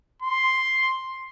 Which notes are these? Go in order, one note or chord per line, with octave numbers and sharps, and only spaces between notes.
C6